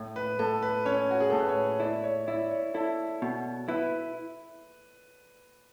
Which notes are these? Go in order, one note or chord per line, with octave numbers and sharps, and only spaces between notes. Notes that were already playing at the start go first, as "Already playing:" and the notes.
Already playing: A2
B4
A2 A4
B4
C#4 C#5
F#4
G#4
A2 A4
B4
C#5
E4 D5
C#5
E4 D5
C#5
E4 A4
B2
E4 B4